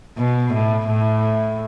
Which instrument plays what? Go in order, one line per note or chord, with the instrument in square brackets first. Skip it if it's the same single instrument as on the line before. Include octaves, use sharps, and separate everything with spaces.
[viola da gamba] B2
A2
A2